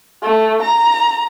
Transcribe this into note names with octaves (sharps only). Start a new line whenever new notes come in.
A3
A#5